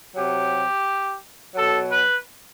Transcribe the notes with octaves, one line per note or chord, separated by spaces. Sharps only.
C3 F#3 G4
B2 F#3 A4
B4